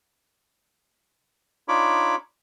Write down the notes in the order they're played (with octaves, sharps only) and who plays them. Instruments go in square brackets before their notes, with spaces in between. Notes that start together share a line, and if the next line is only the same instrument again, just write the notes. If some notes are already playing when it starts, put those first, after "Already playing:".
[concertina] D4 D#4 F4 C#5 B5 D6